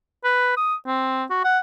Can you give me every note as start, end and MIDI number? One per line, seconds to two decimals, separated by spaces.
0.24 0.52 71
0.57 0.75 87
0.86 1.24 60
1.30 1.39 66
1.44 1.59 78